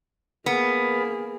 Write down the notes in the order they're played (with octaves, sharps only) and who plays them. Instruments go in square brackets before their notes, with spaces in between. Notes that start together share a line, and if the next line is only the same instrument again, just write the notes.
[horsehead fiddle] A#3 G#4 [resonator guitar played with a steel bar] B3